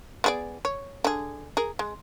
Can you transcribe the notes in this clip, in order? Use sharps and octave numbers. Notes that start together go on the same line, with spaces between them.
B3 G#4 D5
C#5
D3 G#4
G#4 A#4
G#3